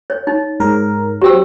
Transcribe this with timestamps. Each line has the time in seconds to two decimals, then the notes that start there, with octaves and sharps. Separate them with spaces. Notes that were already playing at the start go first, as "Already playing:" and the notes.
0.10 C#5
0.27 D#4
0.60 G#2 A#4
1.21 F#3 C4 G4 E6